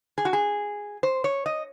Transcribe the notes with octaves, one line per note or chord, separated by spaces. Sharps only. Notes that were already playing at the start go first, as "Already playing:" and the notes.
G#4
F#4
G#4
C5
C#5
D#5